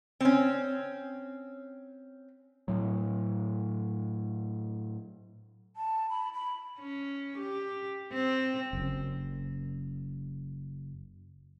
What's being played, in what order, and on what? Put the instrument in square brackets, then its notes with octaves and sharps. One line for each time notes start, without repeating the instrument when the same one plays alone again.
[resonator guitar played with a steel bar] C4 C#4
[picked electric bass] A2 F#3
[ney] A5
B5
B5
[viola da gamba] C#4
G4
C4
[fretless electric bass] F#1 F#2